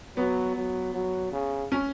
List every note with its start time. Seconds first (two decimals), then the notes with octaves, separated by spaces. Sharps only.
0.17 F#3 B3
0.55 F#3
0.94 F#3
1.32 C#3
1.72 C#4